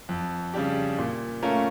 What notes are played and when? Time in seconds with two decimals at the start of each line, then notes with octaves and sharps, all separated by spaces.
0.09 F2
0.54 C#3 G3 D4 G4
0.98 A#2
1.43 A3 C#4 F4 A#4